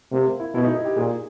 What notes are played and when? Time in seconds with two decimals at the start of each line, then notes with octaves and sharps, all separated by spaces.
0.12 C3 A#3
0.27 A#3
0.40 E4
0.54 B2 E4
0.65 D#4
0.75 D#4
0.85 G4
0.96 A#2 G#4